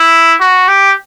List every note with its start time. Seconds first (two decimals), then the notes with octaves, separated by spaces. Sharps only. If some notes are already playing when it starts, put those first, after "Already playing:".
Already playing: E4
0.40 F#4
0.68 G4